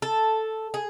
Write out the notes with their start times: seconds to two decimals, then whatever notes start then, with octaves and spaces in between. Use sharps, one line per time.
0.02 A4
0.74 G#4